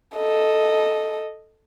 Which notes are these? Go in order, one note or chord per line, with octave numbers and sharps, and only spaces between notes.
A4 D#5